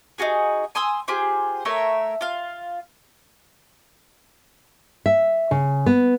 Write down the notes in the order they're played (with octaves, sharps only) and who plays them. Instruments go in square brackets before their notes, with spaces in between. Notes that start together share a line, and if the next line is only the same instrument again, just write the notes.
[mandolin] D#4 F4 F#4 G#4
G#5 C6 D#6 E6
F4 G4 G#4 C5
A3 A#4 C#5 E5
F4 F5
[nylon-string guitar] E5
C#3
B3